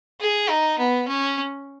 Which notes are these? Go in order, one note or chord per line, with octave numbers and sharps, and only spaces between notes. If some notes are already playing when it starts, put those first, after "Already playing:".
G#4
D#4
B3
C#4